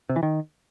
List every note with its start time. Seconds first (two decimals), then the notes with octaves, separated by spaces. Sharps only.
0.09 C3
0.16 E3
0.23 D#3